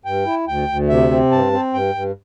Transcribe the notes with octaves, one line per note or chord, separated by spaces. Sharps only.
G2 G5
E4
D2 G5
D2
C3 E5
C4
G2 A5
C4
G2 G5
G2